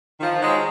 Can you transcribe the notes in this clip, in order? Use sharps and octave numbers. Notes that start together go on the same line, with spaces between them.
D#3 F3
F#3 G#3